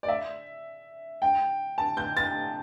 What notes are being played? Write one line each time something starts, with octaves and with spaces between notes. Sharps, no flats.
D5
E5
G5
A5
G6
A6